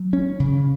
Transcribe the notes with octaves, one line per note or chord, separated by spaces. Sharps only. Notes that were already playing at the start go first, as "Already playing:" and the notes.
Already playing: F#3
C#4
C#3